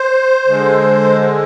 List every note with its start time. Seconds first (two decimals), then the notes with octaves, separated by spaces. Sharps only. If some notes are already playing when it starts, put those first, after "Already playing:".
Already playing: C5
0.47 D3 G#3